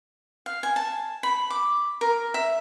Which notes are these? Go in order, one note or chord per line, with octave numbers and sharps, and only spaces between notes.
F5
G#5
A5
B5
D6
A#4
E5